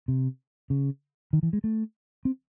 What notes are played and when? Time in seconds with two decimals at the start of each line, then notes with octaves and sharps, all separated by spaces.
0.08 C3
0.70 C#3
1.33 D#3
1.43 E3
1.53 G#3
1.64 A3
2.25 C4